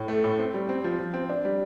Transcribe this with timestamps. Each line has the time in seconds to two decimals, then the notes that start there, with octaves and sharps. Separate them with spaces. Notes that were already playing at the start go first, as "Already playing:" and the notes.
Already playing: A2
0.08 A3
0.24 A2
0.38 C4
0.54 G3
0.69 C4
0.84 F3
0.99 F3
1.14 C4
1.29 D4
1.45 G3